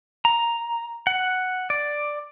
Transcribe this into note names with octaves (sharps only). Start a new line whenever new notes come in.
A#5
F#5
D5